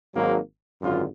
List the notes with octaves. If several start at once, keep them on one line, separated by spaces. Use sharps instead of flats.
G#1 G#2 F#3 A#3
G#1 F#2 D3 F4